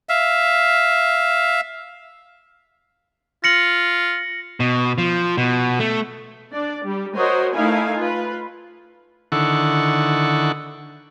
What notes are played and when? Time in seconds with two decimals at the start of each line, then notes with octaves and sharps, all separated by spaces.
0.09 E5 F5
3.44 F4 A#6 C#7 F#7
4.60 B2
4.98 F3
5.37 B2
5.80 A3
6.52 D4 D5
6.84 G3 G4
7.15 F#4 A#4 C5 C#5 D#5
7.52 A3 D#4 E4 A#4 F5 G#5
7.97 F4 B4
9.32 D3 D#3 E4 A4 F#5 C#6